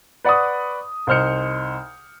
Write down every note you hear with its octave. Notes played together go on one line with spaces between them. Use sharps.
B4 D5 F#5 B5 C#6 D#6
C2 D#4 C5 F6 G6 C#7